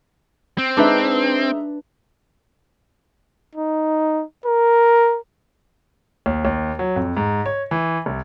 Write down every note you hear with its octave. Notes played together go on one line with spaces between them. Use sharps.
C4
G#3 D4 D#4 B4 E5
D#4
A#4
D#2
D#2
F#3
F2
G#2
C#5
E3
C2